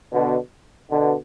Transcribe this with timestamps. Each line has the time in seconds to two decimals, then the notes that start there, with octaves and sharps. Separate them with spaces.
0.13 B2 D3
0.91 B2 D3